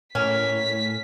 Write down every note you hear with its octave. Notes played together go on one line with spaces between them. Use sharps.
A2 A#3 C#4 B6